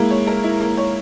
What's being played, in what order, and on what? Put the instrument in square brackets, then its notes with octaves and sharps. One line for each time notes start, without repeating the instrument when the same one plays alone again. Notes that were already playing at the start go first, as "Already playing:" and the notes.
Already playing: [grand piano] G#3 [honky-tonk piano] A#3 E4
[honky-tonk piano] C#5
A#4
E4
A#3
C#5